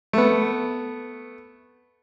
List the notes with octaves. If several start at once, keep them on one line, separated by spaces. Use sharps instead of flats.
A3 B3